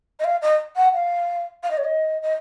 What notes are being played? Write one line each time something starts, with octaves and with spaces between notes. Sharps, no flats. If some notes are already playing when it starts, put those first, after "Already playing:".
D#5
F5
D#5
F#5
F5
F5
D#5
C#5
D#5
D#5